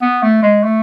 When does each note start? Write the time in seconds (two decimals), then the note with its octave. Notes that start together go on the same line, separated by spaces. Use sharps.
0.01 B3
0.23 A3
0.43 G#3
0.63 A3